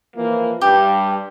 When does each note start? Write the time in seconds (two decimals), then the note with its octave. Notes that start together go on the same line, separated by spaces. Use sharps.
0.16 E3 F3 A#3
0.61 G2 G4